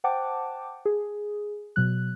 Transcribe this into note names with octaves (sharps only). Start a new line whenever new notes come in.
C5 F#5 G5 A5 D6
G#4
B2 F#3 F#6